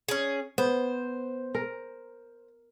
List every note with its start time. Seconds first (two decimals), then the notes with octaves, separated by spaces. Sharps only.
0.08 C#4 G#4
0.58 B3 C5
1.55 A#4